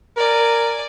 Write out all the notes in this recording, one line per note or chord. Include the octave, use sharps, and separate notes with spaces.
A#4 D5 G#5